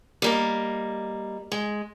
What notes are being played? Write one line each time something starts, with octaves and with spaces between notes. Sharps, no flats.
G3 A#3 D#5
G#3